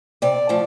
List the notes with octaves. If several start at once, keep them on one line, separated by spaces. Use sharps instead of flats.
C3 D5
F3 A3